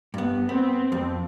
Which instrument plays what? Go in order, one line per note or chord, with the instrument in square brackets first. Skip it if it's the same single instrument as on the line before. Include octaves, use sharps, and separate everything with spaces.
[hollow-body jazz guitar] G2 B3
[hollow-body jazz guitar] B3 [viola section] C4
[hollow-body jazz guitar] F2